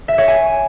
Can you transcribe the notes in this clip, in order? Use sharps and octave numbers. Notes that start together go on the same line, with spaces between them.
E5
C#5
G#5